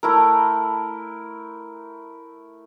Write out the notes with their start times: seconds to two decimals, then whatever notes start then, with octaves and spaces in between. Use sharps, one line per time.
0.03 A3 E4 A#4